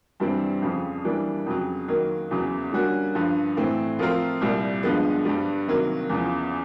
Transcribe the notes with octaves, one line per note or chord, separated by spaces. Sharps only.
G2 E3 G3 C4
F2 C#3 F3
E3 G3 A#3 D4
F2 C#3 F#3
D#3 F#3 A#3
E2 C#3 F#3
D3 G3 A#3 C#4 F#4
G2 D3 F3
A2 E3 A3 C4
F3 A3 C4 F4 A#4
C2 A#2 G3
G2 D3 F3 G#3 B3
G2 D3 G3
C3 D#3 F#3 A#3
E2 C#3 F3